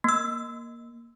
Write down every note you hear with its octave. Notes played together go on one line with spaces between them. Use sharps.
A#3 E6